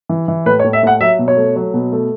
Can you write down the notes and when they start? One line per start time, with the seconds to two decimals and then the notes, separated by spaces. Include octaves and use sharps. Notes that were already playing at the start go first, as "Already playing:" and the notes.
0.09 E3
0.28 E3
0.46 A2 B4
0.60 C#5
0.64 A2
0.73 E5
0.83 A2 F#5
1.01 F#3 E5
1.19 B2
1.28 C#5
1.37 A3
1.56 F#3
1.74 B2
1.92 A3